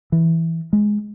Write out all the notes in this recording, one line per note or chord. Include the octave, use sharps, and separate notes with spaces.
E3
G#3